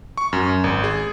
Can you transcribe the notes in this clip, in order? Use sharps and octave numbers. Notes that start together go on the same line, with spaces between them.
C#6
F#2
G#1
G#4